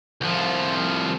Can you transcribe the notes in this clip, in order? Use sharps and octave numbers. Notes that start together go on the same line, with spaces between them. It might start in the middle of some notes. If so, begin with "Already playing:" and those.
C2 F3